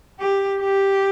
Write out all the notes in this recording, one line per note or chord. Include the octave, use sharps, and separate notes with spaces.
G4
G4